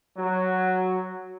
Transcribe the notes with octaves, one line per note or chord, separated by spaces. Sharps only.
F#3